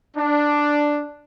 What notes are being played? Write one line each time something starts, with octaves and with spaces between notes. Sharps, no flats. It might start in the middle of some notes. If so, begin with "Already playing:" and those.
D4